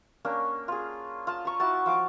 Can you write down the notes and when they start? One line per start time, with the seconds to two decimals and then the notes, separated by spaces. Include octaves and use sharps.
0.25 A#3 C#4 D4
0.68 F4 G#4
1.27 F4 A5
1.45 A#5 C#6
1.60 E4 F#4 A5
1.86 F3 F5 D6